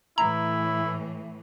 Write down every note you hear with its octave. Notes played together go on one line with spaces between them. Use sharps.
A2 E3 E4 A#5